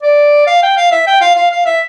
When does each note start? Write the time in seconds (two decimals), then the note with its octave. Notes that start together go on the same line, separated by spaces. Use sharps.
0.02 D5
0.47 F5
0.62 G5
0.77 F5
0.92 E5
1.07 G5
1.21 F5
1.36 F5
1.51 F5
1.66 E5